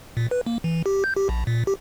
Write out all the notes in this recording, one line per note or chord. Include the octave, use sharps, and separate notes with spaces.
A#2
B4
A#3
E3
G4
G6
G4
A#1
A#2
G4